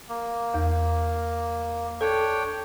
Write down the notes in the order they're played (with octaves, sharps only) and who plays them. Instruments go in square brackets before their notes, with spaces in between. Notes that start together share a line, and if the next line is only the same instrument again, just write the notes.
[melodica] A#3
[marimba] E2
[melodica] D4 C#5 G5 [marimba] A4